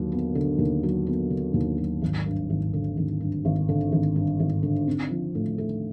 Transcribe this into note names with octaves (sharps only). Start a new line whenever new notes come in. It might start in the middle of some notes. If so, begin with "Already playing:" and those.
Already playing: D#2 D3 F#3
B3
D3
D#2
F#3
B3
D3
D#2
F#3
G#1
G2
G#1
D3
G#1
G2
G#1
D3
G#1
G2
G#1
D3
C4
F3
A2
A3